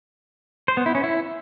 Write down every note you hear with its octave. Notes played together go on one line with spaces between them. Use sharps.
C5
B3
E4
C#4
E4